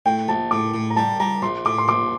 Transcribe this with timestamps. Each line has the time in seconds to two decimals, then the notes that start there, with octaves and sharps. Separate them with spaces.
0.06 A2 G5
0.28 A#1 A5
0.51 A2 D6
0.74 A2
0.90 A#5
0.96 G3 A5
1.20 G3 A#5
1.42 A#1 C6
1.65 A2 D6
1.78 C6
1.88 A#1 D6